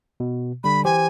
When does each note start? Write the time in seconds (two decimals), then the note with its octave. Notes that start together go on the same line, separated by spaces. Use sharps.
0.20 B2
0.64 D3 G3 B5
0.85 E3 G4 C5 G#5